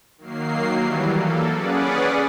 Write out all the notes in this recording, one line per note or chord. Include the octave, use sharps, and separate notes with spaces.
D#3 F#3 A#3 C7
E3 F#3 G3
A#3 A4
C#4 G#4 B4 D5 F#5